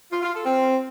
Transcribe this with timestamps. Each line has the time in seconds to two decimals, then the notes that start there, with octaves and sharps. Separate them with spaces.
0.12 F4
0.23 F4
0.34 A4
0.45 C4